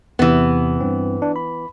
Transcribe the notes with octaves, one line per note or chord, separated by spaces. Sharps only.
E2 C3 E3 B3
G2 C4
D4
B5